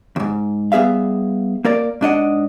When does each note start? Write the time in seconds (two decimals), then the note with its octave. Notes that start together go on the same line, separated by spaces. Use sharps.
0.16 D#2 G#2
0.72 G3 B3 G#4 E5 F5
1.65 A#3 A#4 D5
2.01 G#2 D4 D#5 F#5